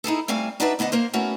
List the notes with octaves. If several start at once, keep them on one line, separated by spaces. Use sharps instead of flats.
D#4 E4 G#4 A4
G3 A3 C4 F5 G#5
D4 D#4 F#4 B4 D5 E5
D2 B3 D4 D#5 F#5
A#3 A#4 C5
A3 B3 C#4 F#4 A#4